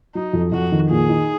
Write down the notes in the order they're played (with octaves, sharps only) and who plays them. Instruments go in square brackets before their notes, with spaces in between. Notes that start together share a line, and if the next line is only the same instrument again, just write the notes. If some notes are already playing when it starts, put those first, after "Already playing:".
[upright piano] F#3 [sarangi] D#4
[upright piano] F2
[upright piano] F2 [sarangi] F#4
[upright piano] D#3
[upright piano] A#2 [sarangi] G#4
[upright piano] D#4